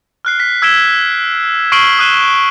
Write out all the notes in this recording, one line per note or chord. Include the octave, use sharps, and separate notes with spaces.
F6 F#6 C7
B6
E6 G#6 B6 D7 E7 G7
C#6 F6 C7 D7 F#7 G7
D#6 E6 F#6 D#7 E7 G7